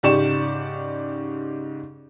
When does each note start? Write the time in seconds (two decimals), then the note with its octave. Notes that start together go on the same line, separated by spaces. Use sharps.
0.03 G#2 C#3 G4 D5 C#6 E7